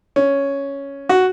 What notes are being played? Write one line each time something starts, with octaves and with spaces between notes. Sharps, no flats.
C#4
F#4